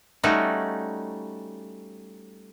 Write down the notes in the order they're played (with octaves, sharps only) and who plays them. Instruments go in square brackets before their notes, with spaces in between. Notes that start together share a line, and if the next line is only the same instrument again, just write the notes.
[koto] G3 A3 C#4 D#4 F#4